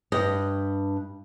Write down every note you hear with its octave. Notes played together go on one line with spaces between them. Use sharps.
G2 D#5